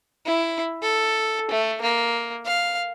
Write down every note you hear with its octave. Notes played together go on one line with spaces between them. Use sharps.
E4
A4
A3
A#3
F5